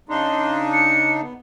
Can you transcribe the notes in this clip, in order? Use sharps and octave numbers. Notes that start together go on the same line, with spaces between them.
C#3 D4 D#4 C6
C#7
B3